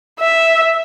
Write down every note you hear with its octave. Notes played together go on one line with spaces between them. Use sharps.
E5